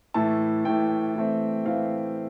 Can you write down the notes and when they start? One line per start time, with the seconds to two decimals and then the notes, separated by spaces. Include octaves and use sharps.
0.14 A2 E3 A3 A5
0.65 A2 E3 A3 G5
1.15 E3 A3 C4
1.65 E3 A3 C4 F5